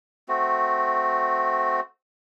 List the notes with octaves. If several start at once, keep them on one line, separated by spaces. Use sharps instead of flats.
A3 C4 F#4